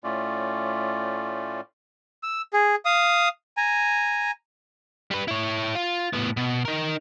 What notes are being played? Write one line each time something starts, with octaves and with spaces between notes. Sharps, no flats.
A2 A3 C#4 F4 D5
E6
G#4
F5 D#6
G#5 A#5
G3 B4
E4 C#5
F4
A2 B3
B2
D#4 A#4